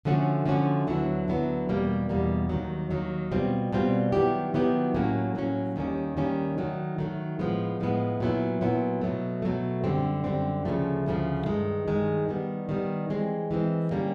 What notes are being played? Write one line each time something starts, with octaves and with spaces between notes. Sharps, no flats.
D3 F3 A3 C#4 F#4
D3 F3 A3 C#4 F#4
D2 D3 F#3 B3 E4
D2 D3 F#3 B3 E4
E2 B2 G3 A#3
E2 B2 G3 A#3
D#2 D#3 F#3
D#2 D#3 F#3
B2 G3 C4 F4
B2 G3 C4 F4
D#3 F#3 B3 E4 G4
D#3 F#3 B3 E4 G4
A2 F#3 A#3 C#4
A2 F#3 A#3 C#4
D#2 D#3 G3 A#3 C#4
D#2 D#3 G3 A#3 C#4
D#3 F#3 A3
D#3 F#3 A3
A2 F3 G#3 B3
A2 F3 G#3 B3
A#2 F#3 B3 E4
A#2 F#3 B3 E4
B2 F#3 A3
B2 F#3 A3
F#2 D3 G3 C4
F#2 D3 G3 C4
D2 C#3 F3 A3
D2 C#3 F3 A3
G2 D#3 G#3
G2 D#3 G#3
D#3 G3 B3
D#3 G3 B3
E3 G#3 C4
E3 G#3 C4
D3 G3 A#3 C#4